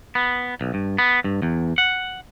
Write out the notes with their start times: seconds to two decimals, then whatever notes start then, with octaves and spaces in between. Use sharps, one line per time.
0.15 B3
0.61 B1
0.74 G2
0.98 B3
1.24 G2
1.42 E2
1.78 F#5